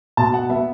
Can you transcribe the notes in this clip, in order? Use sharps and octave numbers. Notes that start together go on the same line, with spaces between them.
B2 A5
F#5
B3 E5